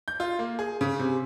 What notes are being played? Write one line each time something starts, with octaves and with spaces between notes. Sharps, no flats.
G6
F4
A#3
G#4
C#3
C3